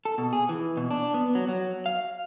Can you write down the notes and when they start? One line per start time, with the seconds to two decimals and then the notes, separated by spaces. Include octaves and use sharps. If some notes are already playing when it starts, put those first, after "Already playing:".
0.05 A4
0.18 B2
0.33 G#4
0.49 E3
0.77 B2
0.91 D4
1.14 B3
1.35 F#3
1.48 F#3
1.86 F5